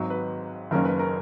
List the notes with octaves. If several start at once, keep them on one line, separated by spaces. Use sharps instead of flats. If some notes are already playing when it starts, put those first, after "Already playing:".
Already playing: G#1 G#2 D#3 F#3
B4
F#1 F#2 D#3 A#3 C#4 A#4
B4
A#4